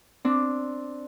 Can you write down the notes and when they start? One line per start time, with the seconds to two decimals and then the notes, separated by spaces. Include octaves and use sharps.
0.25 C4 D4